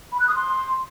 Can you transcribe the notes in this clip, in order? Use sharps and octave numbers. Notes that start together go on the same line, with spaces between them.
B5
F#6
D#6
C6